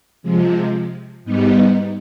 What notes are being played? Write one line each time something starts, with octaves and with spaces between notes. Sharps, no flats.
C3 F3 G#3
G#2 G3 B3 D#4